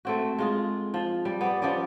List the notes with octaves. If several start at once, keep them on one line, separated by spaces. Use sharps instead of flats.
A3 C4 F#4
G#3 F4 G#4
F3
G3
B3 D5
F3 B3 C#4 D5